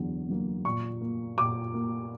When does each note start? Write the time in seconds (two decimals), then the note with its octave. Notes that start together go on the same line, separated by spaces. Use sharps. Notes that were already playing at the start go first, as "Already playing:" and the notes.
Already playing: E2 D3 F#3
0.29 D3 F#3 A#3
0.65 A#2 C#6
1.01 A#3
1.37 A#2 D6
1.74 A#3